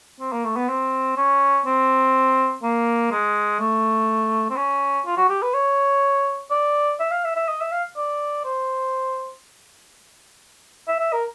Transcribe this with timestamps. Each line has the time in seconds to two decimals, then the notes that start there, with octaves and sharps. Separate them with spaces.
0.20 C4
0.32 A#3
0.45 A3
0.56 B3
0.69 C4
1.17 C#4
1.66 C4
2.63 A#3
3.11 G#3
3.59 A3
4.50 C4
4.56 C#4
5.06 F4
5.17 F#4
5.29 G4
5.42 B4
5.54 C#5
6.50 D5
7.00 E5
7.11 F5
7.24 E5
7.35 E5
7.48 D#5
7.61 E5
7.72 F5
7.97 D5
8.45 C5
10.88 E5
10.99 E5
11.13 A#4